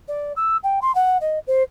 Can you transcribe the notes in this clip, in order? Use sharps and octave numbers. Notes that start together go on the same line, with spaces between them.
D5
E6
G5
C6
F#5
D#5
C5